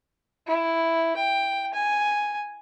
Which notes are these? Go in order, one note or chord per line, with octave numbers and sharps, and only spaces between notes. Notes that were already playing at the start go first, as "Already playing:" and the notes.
E4
G5
G#5